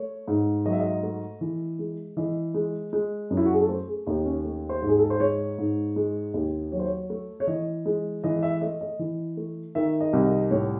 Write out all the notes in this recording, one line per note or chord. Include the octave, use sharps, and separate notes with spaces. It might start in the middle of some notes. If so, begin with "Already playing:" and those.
Already playing: A3 C#5
G#2
F#3 D#5
E5
D#5
A3
E3
G#3
E3 D#5
G#3
G#3
F#2
E4
F#4
G#4
A4
A3 C5
G#4
D#2 D#4
C#4
A3
C5
G#2
G#4
A4
C5
G#3 C#5
G#2
G#3
D#2
F#3 C#5
C5
C#5
A3
C#5
E3 D#5
G#3
E3 D#5
D#5
E5
A3 D#5
D#5
E3
A3
D#3 E5
D#5
C2
D#5
A2 C#5